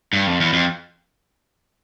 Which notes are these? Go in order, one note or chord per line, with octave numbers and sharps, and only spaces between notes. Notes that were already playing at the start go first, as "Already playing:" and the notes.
G2
F2
E2
F2